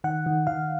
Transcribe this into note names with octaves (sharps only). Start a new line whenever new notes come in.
D#3 F#5
D#3
D#3 F5